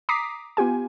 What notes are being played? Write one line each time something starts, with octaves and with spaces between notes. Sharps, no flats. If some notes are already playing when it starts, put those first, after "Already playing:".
A#5 D6 D#6 B6 C7
B3 F4 G4 G#5